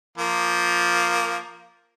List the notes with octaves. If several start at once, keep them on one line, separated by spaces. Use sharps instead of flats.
F3 A#3